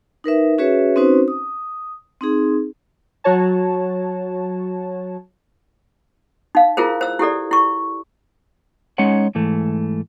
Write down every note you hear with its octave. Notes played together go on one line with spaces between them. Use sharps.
D#4 A#4 B4 E5
C#4 F#4 G#4 B4 C#5 E5
C4 C#4 D#4 F#4 B4 C5
D#6
C4 D#4 G#4
F#3 F#4 C#5 A5
D#4 F5
E4 F4 G#4 A#4 C5
C5 E6
E4 G4 A4 D5
E4 C#6
G#3 C#4 D#4 C#5 F#5
G#2 E3 A3